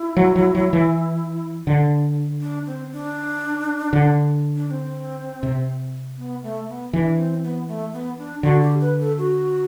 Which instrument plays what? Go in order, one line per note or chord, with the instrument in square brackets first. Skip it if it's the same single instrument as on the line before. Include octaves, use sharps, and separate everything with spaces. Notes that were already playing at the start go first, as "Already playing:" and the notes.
Already playing: [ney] E4
[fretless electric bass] F#3
F#3
F#3
E3
D3
[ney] D4
C4
D4
[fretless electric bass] D3
[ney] D4
D4
C4
[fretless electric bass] C3
[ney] B3
A3
B3
[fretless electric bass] E3 [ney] D4
[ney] C4
B3
A3
B3
D4
[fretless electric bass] D3 [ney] F#4
[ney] G4
B4
A4
F#4